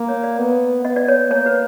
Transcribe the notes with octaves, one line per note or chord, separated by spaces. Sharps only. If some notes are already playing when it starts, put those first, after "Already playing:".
Already playing: A#3
C#5
D5
B3
B3 D#5
D5
C#5
A#3 C#5
B4